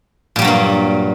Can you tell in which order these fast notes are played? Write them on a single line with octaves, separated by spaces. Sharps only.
A#2 G3 F#3 G2 A#3